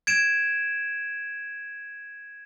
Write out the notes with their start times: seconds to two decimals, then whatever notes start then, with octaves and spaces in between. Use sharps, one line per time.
0.07 G#6 D7 E7